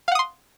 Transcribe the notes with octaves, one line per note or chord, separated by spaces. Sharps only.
F5 F#5 C6 D#6